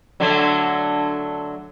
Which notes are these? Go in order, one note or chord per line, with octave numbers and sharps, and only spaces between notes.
D3 F#3 A3